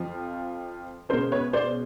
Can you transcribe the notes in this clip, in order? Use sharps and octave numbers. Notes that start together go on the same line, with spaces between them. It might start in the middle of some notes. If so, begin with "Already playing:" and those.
Already playing: F2 F3
B2 G#3 C#4 A#4 C5
B4 C#5
C5 D5